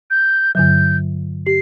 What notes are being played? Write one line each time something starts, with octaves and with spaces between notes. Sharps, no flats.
G6
G2 D3 F#3 G6
G4 C7